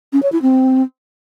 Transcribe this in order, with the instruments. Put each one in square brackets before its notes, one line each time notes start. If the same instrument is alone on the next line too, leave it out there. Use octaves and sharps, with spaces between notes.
[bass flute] C#4
C#5
E4
C4